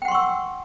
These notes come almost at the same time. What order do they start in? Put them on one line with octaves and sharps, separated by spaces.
G5 F#5 C6 C#6 E6